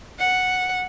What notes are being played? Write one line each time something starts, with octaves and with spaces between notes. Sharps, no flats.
F#5